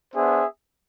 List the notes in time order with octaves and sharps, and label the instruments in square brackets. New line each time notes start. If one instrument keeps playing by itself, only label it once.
[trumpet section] B3 D4 G#4 C5 E5